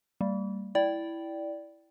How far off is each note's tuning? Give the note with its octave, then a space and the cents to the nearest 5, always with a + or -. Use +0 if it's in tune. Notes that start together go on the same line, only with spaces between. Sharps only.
G3 +0 A#3 -30
E4 +0 D5 -5 G5 -15